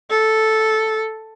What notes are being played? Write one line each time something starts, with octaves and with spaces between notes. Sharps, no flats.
A4